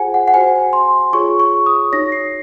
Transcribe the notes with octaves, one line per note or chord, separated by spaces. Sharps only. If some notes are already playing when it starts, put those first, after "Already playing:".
Already playing: F4 G#4 C5 F#5 G#5
F#5
F#5
F#4 C5 G#5
C6
F4 G#4 C#5 C#6
C#6
D#6
D#4 F#4 C#5 A#6
C7